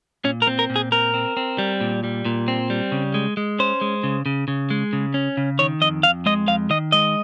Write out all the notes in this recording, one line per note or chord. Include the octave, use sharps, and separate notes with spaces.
A#2 C#4
A#4
C4
A#4
A#2
G#4
C4 A#4
C4
C4
G3
A#2
G3
A#2
C4
G3
C#3
G#3
G#3
C#4 C5
G#3
C#3
C#3
C#3
G#3
C#3
C#4
C#3
D#3 C#5
F2 D#5
F2 F5
G#3 D#5
F2 F5
D#3 D#5
G#3 D#5